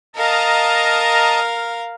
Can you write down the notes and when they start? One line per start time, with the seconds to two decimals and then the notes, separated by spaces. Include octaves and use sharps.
0.16 A#4 D#5 F5 A5 A#5